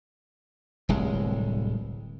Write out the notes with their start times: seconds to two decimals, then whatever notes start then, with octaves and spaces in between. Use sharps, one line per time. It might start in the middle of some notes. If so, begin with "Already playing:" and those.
0.89 D1 C2 G#3